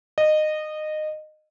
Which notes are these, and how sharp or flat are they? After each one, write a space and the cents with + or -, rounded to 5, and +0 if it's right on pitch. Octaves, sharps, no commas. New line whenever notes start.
D#5 -20